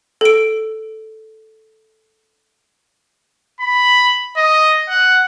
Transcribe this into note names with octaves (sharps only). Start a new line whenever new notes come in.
A4 D7
B5
D#5
F#5